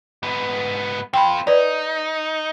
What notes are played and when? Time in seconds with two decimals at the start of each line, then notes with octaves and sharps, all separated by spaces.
0.23 G#2 B3
1.14 C4 F4 G5 B5
1.47 D#4 B4 D5